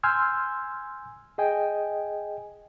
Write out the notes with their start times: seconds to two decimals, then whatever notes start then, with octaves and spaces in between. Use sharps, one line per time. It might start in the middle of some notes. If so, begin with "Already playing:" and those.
0.03 G#5 C6 E6 F6 G6 G#6
1.38 G#4 D#5 G5 G#5